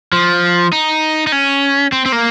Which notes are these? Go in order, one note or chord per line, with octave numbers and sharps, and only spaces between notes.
F3
D#4
D#4
C#4
C4
C4
A#3